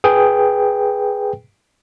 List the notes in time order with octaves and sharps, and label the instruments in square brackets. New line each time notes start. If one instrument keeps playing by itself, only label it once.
[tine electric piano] G#4 B4 G5